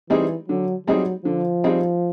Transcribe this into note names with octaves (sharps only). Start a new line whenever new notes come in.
E3 G3 C4 D#4 G#4
D3 F#3
F#3 G3 C4 D#4 G#4
D3 F3
G3 C4 D#4 G#4